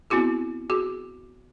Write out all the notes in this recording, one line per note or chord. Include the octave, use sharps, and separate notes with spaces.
B3 C4 E4 F#4 G#4
F#4 G#4